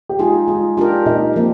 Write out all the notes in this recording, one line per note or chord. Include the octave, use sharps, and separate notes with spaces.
G4
G#3 D#4 F4 G#4
G#3 F4
D4 F4 G4 A#4
A#2 D#4
F3 A#3 C4